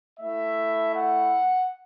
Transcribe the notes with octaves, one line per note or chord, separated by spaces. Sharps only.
A3 E4 E5
F#5